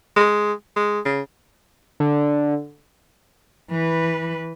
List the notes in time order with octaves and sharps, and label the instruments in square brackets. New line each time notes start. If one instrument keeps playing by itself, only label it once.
[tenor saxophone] G#3
G#3
C#3
[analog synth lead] D3
[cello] E3 B4